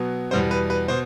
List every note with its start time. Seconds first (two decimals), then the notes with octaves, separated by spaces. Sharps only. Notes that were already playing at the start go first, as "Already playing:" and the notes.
Already playing: B2 F#3 B3
0.31 E2 B2 G3 B3 C5
0.51 B4
0.70 B4
0.88 B2 C5